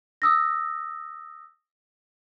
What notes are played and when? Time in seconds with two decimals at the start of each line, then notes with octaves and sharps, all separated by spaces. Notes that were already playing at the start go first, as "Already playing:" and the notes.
0.22 D#6 E6 A#6